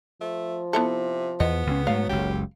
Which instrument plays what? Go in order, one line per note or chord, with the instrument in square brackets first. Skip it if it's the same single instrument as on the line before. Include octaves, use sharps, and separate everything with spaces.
[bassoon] F3 [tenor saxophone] A3
[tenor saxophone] C3 [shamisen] B3 E4 A4
[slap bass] E2 [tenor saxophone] B3 [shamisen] D#5
[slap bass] C#2 C#3 C#4
[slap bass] G#2 A3 [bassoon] F#3 [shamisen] F5
[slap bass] F#1 C#2 [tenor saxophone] G4